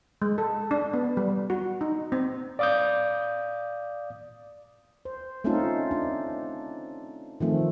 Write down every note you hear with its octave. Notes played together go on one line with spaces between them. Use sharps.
G#3
A4
D4
B3
G3
F#4
D#4
C4
D5 F5 D6 D#6 G6
C5
A3 C4 C#4 D#4 F4 A4
D4
D#3 F3 A3 C4